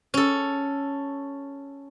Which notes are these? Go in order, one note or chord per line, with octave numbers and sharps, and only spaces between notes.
C#4 A4